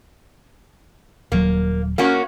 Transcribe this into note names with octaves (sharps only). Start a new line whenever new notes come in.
D#1 F#3 A#3
A#3 C#4 F#4